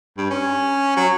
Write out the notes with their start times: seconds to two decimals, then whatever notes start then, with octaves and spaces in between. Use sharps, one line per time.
0.17 G2
0.30 C#4
0.96 F#3